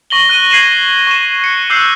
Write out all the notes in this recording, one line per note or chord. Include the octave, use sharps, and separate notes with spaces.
C#6 A#6 F#7 G7
F#6 D#7
G#6 C7 D#7 E7 F#7
C#6 E7
F#6 C#7
D6 E6 F#6 G6 C7